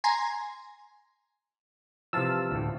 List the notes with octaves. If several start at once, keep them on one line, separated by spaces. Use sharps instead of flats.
G#5 A#5 C6
C3 E3 F3 F5 A5 E6
D2 A2